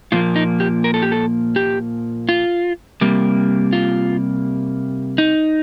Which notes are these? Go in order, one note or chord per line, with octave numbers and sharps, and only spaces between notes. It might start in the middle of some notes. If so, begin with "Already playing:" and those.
A#2 F3 A#3 F4
D#4
G4
A#4
A4
G4
A4
G4
F4
C3 G3 A#3
F4
D#4